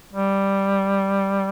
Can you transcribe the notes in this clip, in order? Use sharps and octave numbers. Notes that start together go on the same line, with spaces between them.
G3